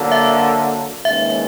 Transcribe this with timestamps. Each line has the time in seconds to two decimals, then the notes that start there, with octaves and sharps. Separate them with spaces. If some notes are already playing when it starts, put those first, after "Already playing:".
Already playing: D3 F#3 A#3
0.12 E5
1.04 D#2 C#3 E3 G#3 E5